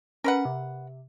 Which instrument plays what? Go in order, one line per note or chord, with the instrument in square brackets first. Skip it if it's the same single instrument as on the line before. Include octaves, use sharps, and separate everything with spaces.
[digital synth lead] C#4 [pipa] A#4 B4 F#5
[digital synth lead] C3